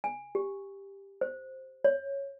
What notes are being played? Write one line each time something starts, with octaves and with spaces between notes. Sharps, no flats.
G#5
G4
C5
C#5